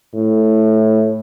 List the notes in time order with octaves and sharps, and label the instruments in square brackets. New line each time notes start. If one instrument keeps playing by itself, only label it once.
[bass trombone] A2